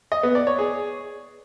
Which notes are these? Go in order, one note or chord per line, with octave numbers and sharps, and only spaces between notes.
D#5
B3
D5
C#5
G#4